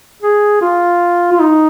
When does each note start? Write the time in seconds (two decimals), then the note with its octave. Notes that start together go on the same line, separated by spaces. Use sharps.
0.22 G#4
0.61 F4
1.32 F4
1.40 D#4